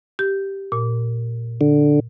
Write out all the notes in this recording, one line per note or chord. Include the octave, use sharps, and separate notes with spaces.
G4
A#2
D3